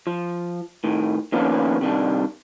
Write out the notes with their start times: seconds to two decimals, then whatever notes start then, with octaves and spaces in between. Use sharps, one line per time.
0.07 F3
0.84 A2 D#3
1.32 D#3 F3 A#3 B3 C#4 D4
1.81 C3 D#3 G3 D4